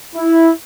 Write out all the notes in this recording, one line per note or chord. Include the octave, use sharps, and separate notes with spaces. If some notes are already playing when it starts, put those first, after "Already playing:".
E4